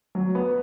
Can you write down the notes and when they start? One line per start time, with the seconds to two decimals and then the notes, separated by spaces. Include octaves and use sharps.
0.15 F#3
0.35 B3